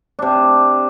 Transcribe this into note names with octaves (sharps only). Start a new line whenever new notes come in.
C3 D4